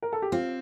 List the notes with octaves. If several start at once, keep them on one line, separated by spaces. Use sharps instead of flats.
A#4
A4
G4
C4 F4